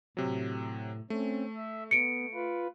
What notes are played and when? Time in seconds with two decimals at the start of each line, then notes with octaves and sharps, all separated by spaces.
0.17 A2 C3 F#3
1.10 A3 C4 C#4
1.56 E5
1.91 B3 C#7 D7
2.34 F4 B4